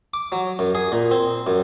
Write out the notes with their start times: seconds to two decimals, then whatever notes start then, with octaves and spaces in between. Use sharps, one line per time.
0.14 D6
0.32 F#3
0.59 F#2
0.75 G#4
0.92 A#2
1.11 C4
1.47 F#2